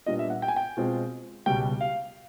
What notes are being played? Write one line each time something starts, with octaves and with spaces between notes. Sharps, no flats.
A#2 G3 B3 D4 F4 D#5
E5
F#5
G5
G#5
G5
B2 G#3 C4 F4
C#2 B2 G3 G5
F5